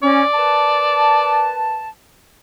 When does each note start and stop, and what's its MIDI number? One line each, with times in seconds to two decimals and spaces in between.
0.03 0.23 61
0.03 1.51 74
0.34 1.88 70
0.34 1.88 71
0.34 1.88 81